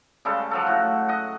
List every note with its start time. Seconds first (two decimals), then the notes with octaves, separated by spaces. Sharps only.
0.25 C#3 G3 G#3 A4
0.51 F3 F#3 A4
0.67 A2 F#4
1.08 D#5 F#5